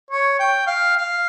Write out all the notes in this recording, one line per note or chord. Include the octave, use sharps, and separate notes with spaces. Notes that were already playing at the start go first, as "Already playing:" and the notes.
C#5
G5
F5
F5